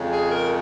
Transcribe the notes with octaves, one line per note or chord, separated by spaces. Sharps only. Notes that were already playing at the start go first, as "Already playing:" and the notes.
Already playing: F2 C#3 G#3
G#4
A#4